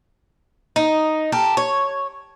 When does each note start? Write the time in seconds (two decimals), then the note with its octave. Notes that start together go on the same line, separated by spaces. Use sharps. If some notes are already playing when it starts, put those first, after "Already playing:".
0.76 D#4
1.32 G4 A4 A#4
1.57 C#5